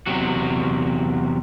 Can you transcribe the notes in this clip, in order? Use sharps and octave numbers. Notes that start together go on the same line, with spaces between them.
E2 C3 F#3 F#4